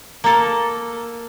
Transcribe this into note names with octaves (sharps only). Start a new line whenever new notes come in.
A#3 A4